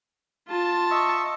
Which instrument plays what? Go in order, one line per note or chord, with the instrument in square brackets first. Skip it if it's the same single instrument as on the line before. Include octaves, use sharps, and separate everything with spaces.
[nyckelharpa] F4 A5
[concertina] D#5 E5 C#6